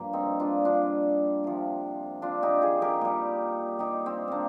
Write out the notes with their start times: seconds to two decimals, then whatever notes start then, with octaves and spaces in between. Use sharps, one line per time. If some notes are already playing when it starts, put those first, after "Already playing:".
Already playing: G2 F3 A#3
0.13 C4 D#4
0.40 D4 F4
0.65 D4 F4
1.44 C3 F3
2.22 D4 F4
2.42 D#4 G4
2.61 F4 G#4
2.82 G4 A#4
3.01 A#2 G3
3.79 D#4 G4
4.06 C4 D#4
4.28 A#3 C4 D4